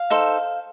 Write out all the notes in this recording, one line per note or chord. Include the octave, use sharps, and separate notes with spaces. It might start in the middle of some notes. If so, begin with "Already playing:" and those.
Already playing: F5
D#4 A4 C5